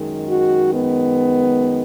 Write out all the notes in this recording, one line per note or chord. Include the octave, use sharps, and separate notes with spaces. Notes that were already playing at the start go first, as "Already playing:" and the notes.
Already playing: F#2 D#3 G#3
F#4
B3